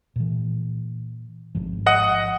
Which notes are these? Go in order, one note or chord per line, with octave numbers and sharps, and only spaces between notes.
A#2 E3
G#1 G#2 F3
D#5 F#5 D#6